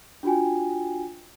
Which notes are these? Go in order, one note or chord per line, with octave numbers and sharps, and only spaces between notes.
D4 F4 F#4 G5 G#5